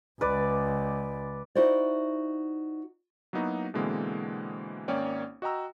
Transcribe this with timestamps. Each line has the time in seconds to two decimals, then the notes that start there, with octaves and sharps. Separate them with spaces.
0.21 C#2 B4 D5
1.55 D#4 E4 F#4 C5 D5
3.33 F#3 A#3 B3 D#4 E4 F#4
3.74 B2 D3 E3 G#3 A#3 C4
4.88 G#1 A#3 C#4 C#5 D5 G5
5.42 F#4 D#5 G5 A#5 E6